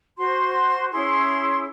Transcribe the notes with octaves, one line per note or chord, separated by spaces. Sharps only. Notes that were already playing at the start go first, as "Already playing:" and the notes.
F#4 C5 C6
C#4 E4 G#4 C6